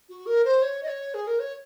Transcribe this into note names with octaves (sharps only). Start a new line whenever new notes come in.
F#4
A#4
C5
C#5
D#5
C#5
G#4
A#4
C#5